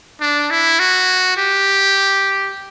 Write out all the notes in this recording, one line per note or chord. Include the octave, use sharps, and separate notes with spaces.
D4
E4
F#4
G4